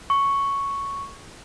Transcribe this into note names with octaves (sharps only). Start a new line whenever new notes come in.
C#6